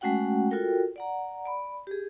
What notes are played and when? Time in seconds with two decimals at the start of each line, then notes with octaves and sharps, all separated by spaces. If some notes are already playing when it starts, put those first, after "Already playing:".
0.01 G#3 A3 C#4 F#4 F#5 G5
0.51 F4 F#4 A4 A#4 G5
0.96 D5 F#5 A#5
1.45 D5 B5
1.87 G4 G#4